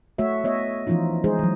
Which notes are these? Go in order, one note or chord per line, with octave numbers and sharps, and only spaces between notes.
A3 F#4 C#5 E5
B3 C#5 D#5 E5
E3 F3 C#4 D#4 F4
G#3 D#4 G#4 C5
E3 F#3